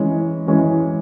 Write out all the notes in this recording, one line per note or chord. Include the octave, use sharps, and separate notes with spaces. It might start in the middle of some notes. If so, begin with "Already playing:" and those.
Already playing: E3 G#3 C#4
E3 G#3 C#4